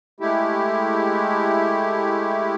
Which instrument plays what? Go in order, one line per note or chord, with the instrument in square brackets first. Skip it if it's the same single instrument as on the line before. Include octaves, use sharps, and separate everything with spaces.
[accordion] G#3 A3 E4 G4